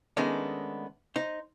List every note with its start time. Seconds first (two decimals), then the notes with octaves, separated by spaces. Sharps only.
0.17 D#3 G#3 A3 B3 C#4 D4
1.16 D#4 C5